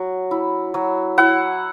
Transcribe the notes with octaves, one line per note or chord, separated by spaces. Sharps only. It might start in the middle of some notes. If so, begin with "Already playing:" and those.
Already playing: F#3
E4
F#3
E4 F#5